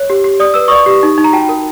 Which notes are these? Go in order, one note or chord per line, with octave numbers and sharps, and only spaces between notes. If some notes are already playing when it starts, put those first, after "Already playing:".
Already playing: C#5
G4
G4
D5 D#6
B4 E6
D5 C#6 D#6
G4
D#4
D#4
A#5
F#4 G5 A5
A#4